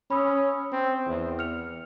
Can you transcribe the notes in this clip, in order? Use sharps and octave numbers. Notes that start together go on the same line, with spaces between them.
C#4 B5 D#6 E6
C4
E2
F6 C#7 F7